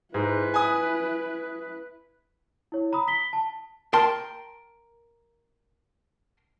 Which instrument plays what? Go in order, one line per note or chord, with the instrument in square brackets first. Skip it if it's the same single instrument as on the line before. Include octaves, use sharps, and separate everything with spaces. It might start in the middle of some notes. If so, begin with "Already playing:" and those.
[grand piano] G#2 [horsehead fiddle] E4 B4
[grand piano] G#5 D#6
[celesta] E4 C#5
A#5 B5 D#6
B6 G7
A5
[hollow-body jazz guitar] A#4 G5 A5 C6